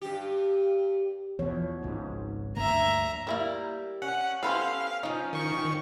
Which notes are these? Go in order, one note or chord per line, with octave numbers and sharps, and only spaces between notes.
G2 G4
E2 B2 F3 C#5
G#1 C#2 G#2
D2 G2 A#3 E5 A#5
G3 A#3 E4 A#4
C#4 F#5
B3 C#4 G4 A4 B4 C5 F5
F3 C#4 D#4
D#3 C#6